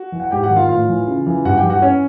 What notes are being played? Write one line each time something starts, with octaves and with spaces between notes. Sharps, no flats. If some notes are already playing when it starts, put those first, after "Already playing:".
Already playing: F#4
E3
F#5
G#2 G4 G5
F#4 F#5
D#3
F4 F5
A2 F4 F5
E3
C#3
E3
G2 F#4 F#5
G4 G5
E3
F#4 F#5
C#4 C#5